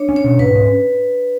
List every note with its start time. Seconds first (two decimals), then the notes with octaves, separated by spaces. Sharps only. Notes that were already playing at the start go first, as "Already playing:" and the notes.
Already playing: D4 C#5
0.09 C#4
0.16 C#5
0.24 B2
0.39 G#2 B4
0.55 C#4